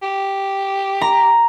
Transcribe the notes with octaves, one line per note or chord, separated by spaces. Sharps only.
G4
A#5